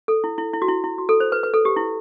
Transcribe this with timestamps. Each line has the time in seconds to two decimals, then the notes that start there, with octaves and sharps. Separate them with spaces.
0.08 A4
0.24 E4
0.38 E4
0.53 E4
0.62 F#4
0.68 E4
0.84 E4
0.98 F#4
1.09 A4
1.20 C5
1.32 B4
1.43 B4
1.54 A4
1.65 G4
1.76 E4